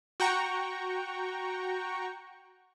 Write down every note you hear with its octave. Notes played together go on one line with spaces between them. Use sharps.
F#4 G5 A#5 C#6